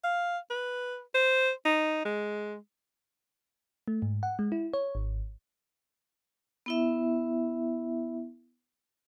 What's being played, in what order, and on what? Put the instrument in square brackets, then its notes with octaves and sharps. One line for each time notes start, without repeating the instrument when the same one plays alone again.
[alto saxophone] F5
B4
C5
D#4
G#3
[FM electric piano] A3
G#2
F#5
G#3
E4
C#5
G#1
[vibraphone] B3 E4 E5